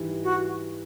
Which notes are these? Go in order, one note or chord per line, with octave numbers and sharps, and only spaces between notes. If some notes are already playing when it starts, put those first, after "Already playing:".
Already playing: G#2 E3 G3
F#4